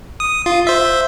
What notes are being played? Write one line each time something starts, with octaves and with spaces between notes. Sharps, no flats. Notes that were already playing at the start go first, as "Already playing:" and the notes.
D#6
F4
C5 E5